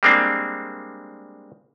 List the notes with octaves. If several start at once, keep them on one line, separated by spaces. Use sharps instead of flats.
G3 G#3 A#3 C4 D4